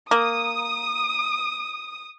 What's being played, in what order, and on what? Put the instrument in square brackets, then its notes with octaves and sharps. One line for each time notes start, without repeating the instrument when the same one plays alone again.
[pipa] A#3 [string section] D#6